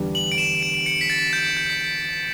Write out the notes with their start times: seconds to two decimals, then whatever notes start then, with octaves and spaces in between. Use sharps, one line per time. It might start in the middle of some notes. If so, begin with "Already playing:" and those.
Already playing: E2 D3 G3 D4
0.15 F#7
0.32 D7
0.38 E7
0.63 D7
0.86 C#7
1.01 B6
1.10 A6
1.33 G6
1.57 G6
1.70 B6